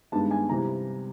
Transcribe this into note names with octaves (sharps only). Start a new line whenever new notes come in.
G2 D#3 G#3 B3 A5
G#5
C3 E3 G3 A#5